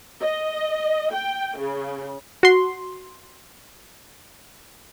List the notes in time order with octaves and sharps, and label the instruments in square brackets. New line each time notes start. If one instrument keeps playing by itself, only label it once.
[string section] D#5
G5
C#3
[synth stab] F#4 C6